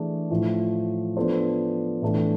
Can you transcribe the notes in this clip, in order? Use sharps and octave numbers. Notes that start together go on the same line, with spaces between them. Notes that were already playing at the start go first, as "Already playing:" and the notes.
Already playing: E3 A3 D4 G#4
A2 F3 A3
F3 B3 D4 A4 C5
A2 E3 A3 D4 A4